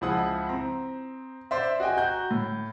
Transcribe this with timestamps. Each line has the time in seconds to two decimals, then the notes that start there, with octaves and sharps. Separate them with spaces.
0.01 C#2 F3 G#3 E4 F#5 D#6
0.49 C4 A#5
1.51 C5 D5 E5
1.80 F#4 D#5 G5 G#5
1.97 F#4 A#5 G6
2.31 A2